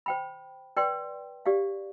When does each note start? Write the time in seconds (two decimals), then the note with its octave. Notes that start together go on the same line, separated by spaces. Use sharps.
0.06 C5 G5 B5
0.77 B4 D5 G5 C6
1.46 G4 D5 F5